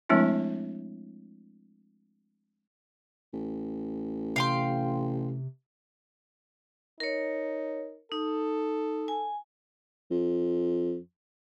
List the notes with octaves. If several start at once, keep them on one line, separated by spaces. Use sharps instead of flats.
F3 G#3 A3 C4 D4 E4
A1
C3 F5 G5 C6
D#4 A#4 C#5
D#4 A4
G#5
F2